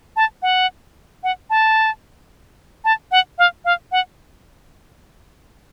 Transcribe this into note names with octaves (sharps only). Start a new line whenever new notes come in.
A5
F#5
F#5
A5
A5
F#5
F5
F5
F#5